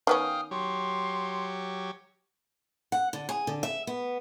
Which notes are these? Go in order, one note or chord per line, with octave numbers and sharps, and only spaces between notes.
D#3 B3 C#4 F5 G5 D#6
F#3 G4 C#5 C6
F#5
D3
G#4
D3
E5
B3